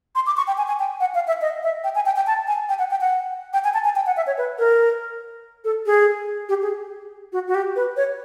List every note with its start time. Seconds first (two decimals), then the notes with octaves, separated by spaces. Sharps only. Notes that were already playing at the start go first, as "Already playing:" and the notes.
0.15 C6
0.27 D6
0.37 C#6
0.47 G5
0.58 G#5
0.68 G#5
0.79 G5
1.00 F#5
1.15 F5
1.28 E5
1.42 D#5
1.63 E5
1.84 G5
1.95 G#5
2.06 G5
2.16 G5
2.27 A5
2.47 G#5
2.69 G5
2.79 F#5
2.91 G5
3.01 F#5
3.53 G5
3.64 G#5
3.74 A5
3.84 G#5
3.96 G5
4.06 F#5
4.17 E5
4.27 C#5
4.38 B4
4.59 A#4
5.64 A4
5.86 G#4
6.49 G4
6.62 G#4
7.33 F#4
7.48 F#4
7.55 G4
7.76 B4
7.97 C#5